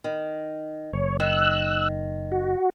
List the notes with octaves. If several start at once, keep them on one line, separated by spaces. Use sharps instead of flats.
D#3
F#1 C#5
D#3 E6 F#6
F#4